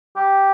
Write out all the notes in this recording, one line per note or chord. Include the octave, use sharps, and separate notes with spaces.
G4